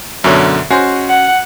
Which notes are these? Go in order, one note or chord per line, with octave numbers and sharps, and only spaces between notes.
F#2 B2 D3 A3 A4 C#5
G#3 C#4 F#4 C5
F#5